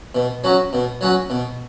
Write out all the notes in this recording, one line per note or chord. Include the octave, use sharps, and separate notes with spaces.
B2
F#3 C#4 F#4
B2
F#3 C#4 F#4
B2